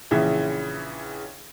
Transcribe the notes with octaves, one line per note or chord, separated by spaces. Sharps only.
A#1 C#3 E3 E5